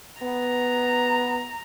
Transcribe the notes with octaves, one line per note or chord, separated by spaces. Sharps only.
B3 A#5